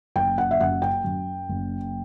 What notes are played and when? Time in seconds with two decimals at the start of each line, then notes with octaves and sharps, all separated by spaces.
0.16 F#1 G5
0.38 F#5
0.51 E5
0.60 F#2 F#5
0.82 G5
1.04 F#2
1.49 F#1